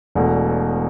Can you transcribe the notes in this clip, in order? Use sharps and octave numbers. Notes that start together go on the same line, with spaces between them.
E1 E2 B2 A3